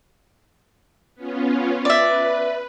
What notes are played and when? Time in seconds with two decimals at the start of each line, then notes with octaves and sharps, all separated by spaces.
1.15 B3 C#4 F4
1.85 B4 D5 E5